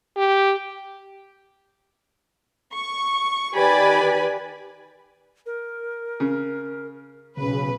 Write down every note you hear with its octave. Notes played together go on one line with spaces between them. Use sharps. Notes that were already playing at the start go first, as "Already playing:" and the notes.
G4
C#6
D#3 G4 B4 D5 G#5 B5
A#4
C#3
B1 C#3 B4